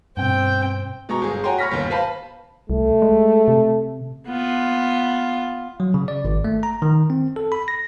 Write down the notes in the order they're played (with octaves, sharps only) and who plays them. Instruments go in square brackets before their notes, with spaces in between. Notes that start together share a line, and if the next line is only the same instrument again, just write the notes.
[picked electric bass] G2 B2 [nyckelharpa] C4 G5
[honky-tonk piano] B2 G#3 A#5 C#6
G1 G#4
F#4 C#5 G5 G#5 A#5 C6
C#5 B5 C#6 F6 A#6 B6
G1 D#2
B4 C5 F5 A5 B5
[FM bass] C2 [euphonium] A3
[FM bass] G#3
C3
[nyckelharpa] B3 F4
[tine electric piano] F#3
C#3
D5
G#1
A3
A#5
D#3
C4
A4
B5
A#6